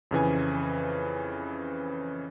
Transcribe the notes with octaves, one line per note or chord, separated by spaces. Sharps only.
F2 C#3 E3 G#5